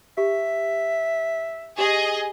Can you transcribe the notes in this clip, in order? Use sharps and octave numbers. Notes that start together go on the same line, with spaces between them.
G4 E5
G4 G#4 D#5